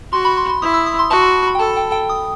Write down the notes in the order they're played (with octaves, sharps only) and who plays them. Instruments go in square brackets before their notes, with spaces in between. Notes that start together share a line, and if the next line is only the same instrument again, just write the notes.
[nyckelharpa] F#4 [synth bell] C6
[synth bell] B5
C6
C6
[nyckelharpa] E4 [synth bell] D#6
[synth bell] E6
D#6
C6
[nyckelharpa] F#4 [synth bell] A5
[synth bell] B5
B5
G5
[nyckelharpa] A4 [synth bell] A5
[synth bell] G5
G5
D#6